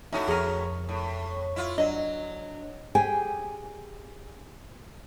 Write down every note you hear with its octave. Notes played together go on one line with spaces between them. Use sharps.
A2 C#4 D#4 E4 F#4
F2 G#4 A#4 C#6
A2
E4 F4
F#3 D4 D#5
G4 G#4 G5 G#5